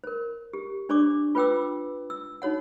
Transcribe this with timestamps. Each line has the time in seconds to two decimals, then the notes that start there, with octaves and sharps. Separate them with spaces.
0.04 A#4 C5
0.53 G4
0.89 D4 C5 D5 C#6 D6
1.35 F4 B4 C5 G5 D6 E6
2.10 E6
2.42 D#4 F#4 C#5 F#5